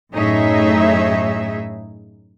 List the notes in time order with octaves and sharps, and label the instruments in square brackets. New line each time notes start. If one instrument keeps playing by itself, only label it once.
[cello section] F#2 A2 D#4 G#4 C#5 E5